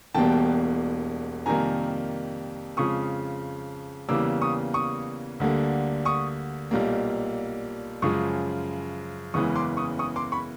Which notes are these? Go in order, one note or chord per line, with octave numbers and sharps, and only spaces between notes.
E1 E2 B2 G3 A#3 G5 A5
F2 C3 D#3 G3 A#3 G#5 A#5
F2 C#3 F3 G#3 C#6 D#6
E2 C#3 E3 G3 A#3 D6 E6
C#6 D#6
C#6 D#6
D2 D3 G3 A#3
C#6 D#6
B1 A#2 G3 A#3
F#2 C#3 F3 G#3 C#6 D#6
F#1 E2 C#3 E3 G#3 C#6 D#6
C6 D6
C#6 D#6
C#6 D#6
C6 D6
B5 C#6